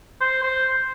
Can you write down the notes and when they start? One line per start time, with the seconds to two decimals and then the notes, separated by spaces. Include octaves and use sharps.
0.21 C5
0.43 C5